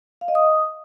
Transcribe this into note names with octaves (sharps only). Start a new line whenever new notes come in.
F5
D#5
D#6